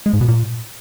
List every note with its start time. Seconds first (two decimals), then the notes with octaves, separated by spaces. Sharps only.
0.06 G#3
0.13 G#2
0.21 B2
0.28 A#2